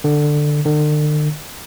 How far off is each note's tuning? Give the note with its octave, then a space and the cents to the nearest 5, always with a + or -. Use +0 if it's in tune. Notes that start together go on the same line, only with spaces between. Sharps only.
D3 +10
D3 +40